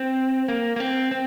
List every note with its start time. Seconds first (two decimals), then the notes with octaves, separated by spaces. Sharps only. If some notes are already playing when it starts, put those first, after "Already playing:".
Already playing: C4
0.48 A#3
0.76 A#3
0.80 C4
1.11 C4